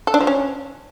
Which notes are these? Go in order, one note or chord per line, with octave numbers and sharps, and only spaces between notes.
A4
D4
F3
C#4